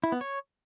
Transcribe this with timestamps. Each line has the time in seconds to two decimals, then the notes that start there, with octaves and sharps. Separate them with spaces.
0.04 E4
0.12 B3
0.21 C#5